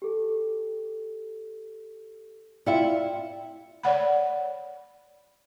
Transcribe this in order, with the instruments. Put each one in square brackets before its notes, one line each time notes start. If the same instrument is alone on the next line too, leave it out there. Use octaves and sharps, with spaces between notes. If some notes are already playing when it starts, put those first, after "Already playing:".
[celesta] G4 A4
[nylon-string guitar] E4 F4 E5 [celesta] D5 G5 C#7
[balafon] C#5 D5 F#5 B5